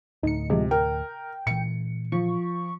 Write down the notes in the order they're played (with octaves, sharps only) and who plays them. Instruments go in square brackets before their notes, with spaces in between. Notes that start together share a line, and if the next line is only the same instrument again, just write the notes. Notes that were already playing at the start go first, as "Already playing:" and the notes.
[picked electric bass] D2 A2 [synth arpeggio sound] D#4 C#7
[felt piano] C3 [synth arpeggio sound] F3 G#3
[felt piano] A#4 [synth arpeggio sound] G5
[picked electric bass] A#2 E3 [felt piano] C#7
[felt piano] F3 [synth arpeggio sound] C#6